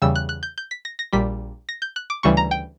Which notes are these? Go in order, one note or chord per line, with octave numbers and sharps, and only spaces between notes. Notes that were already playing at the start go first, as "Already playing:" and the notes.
E2 C#3 G3 E6
F#6
F#6
G6
G6
B6
A#6
A#6
A#1 A#2 G3 B6
A#6
G6
F#6
D6
D2 C#3 E3 G3 C#6
A#5
G5